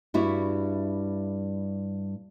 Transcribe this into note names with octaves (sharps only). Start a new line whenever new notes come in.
G2 G3 E4 F#4